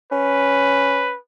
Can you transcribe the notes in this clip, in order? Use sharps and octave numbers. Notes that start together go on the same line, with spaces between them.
C#4 B4